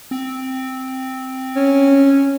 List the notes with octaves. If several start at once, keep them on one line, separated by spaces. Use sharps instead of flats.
C4
C#4